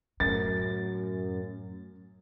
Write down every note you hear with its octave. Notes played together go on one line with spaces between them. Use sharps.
F#2 A2 A6